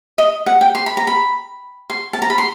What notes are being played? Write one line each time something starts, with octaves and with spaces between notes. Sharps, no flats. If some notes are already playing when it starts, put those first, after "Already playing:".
D#5
F#5
G5
C6
B5
A#5
B5
C6
A5
A#5
B5
C6